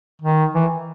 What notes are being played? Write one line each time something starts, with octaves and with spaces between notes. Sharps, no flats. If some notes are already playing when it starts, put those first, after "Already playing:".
D#3
E3